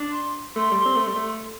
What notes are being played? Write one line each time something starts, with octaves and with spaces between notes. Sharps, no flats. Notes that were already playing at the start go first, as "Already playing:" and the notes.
Already playing: D4
C6
A3 C6
G3
C4
A3
G3
A3